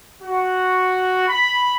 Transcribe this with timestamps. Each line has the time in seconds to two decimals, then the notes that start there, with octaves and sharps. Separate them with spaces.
0.22 F#4
1.28 B5